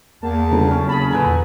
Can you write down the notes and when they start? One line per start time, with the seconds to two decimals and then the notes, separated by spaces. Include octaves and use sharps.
0.23 E2 A#3 A5
0.51 G1 C#3 A#5
0.71 F#1 C#4
0.89 G#4 A5 B5
1.11 A#2 D3 B4 G#5 A#5
1.26 E2